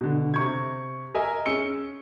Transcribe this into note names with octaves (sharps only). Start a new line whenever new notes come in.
B2 D3
C3 C#6 G#6
A#4 D#5 E5 G#5
C#4 G#4 E6 C#7 G7